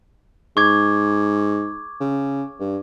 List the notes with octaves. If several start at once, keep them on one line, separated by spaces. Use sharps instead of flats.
G#2 C#6 D6 G#6
C#3
G2